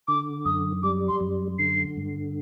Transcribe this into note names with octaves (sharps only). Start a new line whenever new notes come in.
D3 D6
F#2 D#6
G3 D6
C6
F#2
D3 C7
G2